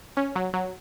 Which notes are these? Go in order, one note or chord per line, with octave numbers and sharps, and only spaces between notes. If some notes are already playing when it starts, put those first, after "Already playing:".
C#4
F#3
F#3